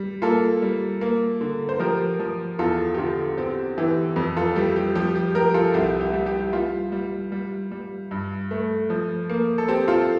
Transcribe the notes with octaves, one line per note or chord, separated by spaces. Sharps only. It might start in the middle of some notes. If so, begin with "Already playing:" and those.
Already playing: G3
A#3 F4 A4
G3
A#3
D3
C5
F3 G4 A#4
F3
E2 F4 A4
G4
D3 F4
C4 G4
E3 G4
F2
F4 A4
G3 G4
G4
F3 G4
G4
F3 G4 A#4
F4 A4
C2 G4
G4
G3
G4
G3 F4
G3
G3
G3
G2
A3
F3
A#3
A4
C4 G4
F4 A4